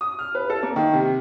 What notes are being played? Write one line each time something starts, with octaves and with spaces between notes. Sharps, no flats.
D#6
F6
B4
A4
A#3
D#3
C3